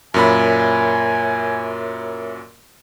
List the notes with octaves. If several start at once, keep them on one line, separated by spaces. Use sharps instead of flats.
F#2 A#2 A#4 C#5 E5 G#5 B5